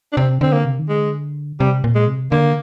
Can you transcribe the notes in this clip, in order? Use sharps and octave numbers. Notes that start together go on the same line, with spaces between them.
D4
C3 C4
D3 C4
A#3
C3
D#3
D3 G#3
C3 G3
A#2
G#3
C3
D3 A#3